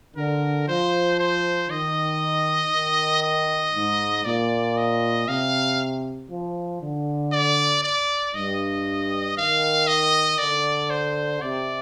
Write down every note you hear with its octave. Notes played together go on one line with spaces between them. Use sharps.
D3 A#4
F3 C5
C5
D#3 D#5
D#3
D#5
G#2
A#2 D5
D#5
C3 F5
F3
D3
D5
D5
G2 D#5
D#3 F5
D#5
D3 D5
C5
C3 D5